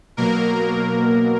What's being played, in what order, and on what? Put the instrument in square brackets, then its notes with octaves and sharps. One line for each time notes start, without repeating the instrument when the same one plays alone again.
[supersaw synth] B2 F#3 A#3 A#4